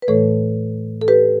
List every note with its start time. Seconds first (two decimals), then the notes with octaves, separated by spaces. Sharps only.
0.02 B4
0.08 A2 E3 A3 A4 C#5
1.01 A4
1.08 G4 B4